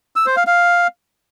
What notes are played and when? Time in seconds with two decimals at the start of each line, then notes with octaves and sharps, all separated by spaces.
0.16 E6
0.26 C5
0.37 F5
0.47 F5